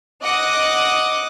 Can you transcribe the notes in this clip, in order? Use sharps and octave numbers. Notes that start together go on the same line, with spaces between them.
D#5 F#5 D6 D#6 F#6